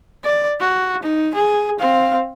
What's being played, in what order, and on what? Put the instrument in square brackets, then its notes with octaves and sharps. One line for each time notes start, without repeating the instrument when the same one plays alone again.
[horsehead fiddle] D5
F#4
D#4
G#4
C4 F5